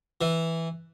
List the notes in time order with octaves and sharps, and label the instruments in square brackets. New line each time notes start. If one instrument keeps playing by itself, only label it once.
[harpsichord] E3